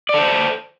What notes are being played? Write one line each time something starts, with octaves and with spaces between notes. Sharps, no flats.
A4 C5 D5